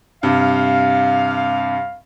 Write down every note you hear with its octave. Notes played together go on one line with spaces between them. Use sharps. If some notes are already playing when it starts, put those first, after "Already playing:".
G2 C3 F5